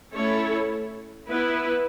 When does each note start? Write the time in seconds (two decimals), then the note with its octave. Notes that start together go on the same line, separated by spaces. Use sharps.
0.13 A3 C#4 E4 A4 C#5
1.27 B3 E4 B4